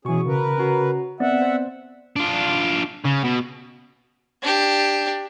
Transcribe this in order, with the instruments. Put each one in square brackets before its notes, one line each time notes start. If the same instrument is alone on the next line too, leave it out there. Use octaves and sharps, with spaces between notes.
[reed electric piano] B2 E3 [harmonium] C#4 G#4 [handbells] F#4 C#6
[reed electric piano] C#3 [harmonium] A#4 B4
[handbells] C#4 F#4 A#5
[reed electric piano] B3 C4 [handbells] D5 [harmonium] E5 F#5
[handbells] C5 A6
[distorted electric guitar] D4 F4
C#3
B2
[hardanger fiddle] D4 G4